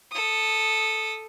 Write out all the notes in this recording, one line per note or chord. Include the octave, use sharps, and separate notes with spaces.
A4 D#6